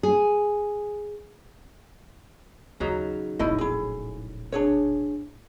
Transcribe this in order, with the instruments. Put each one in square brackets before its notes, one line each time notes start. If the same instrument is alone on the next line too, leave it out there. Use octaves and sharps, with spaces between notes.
[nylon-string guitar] G#4
[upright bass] D#2 [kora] C#3 F#3 D#4
[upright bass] E1 A#1 [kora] A2 [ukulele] D#4 E4 D#5
[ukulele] E4 G#4
D4 G#4 C#5